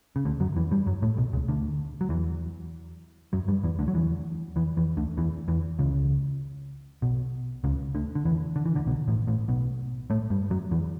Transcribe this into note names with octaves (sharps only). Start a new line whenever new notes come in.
C#3
D2 D3
F#2 F#3
E2 E3
G2 G3
F#2 F#3
A2 A3
B1 B2
C#2 C#3
D2 D3
F#3
E2 E3
F#2 F#3
G2 G3
E2 E3
D2 D3
F#3
E2 E3
E2 E3
E2 E3
D2 D3
E2 E3
E2 E3
C#2 C#3
B1 B2
C#2 C#3
D2 D3
D3
E2 E3
D3
E3
D2 D3
B1 B2
A1 A2
A1 A2
B1 B2
A2 A3
G2 G3
F#2 F#3
E2 E3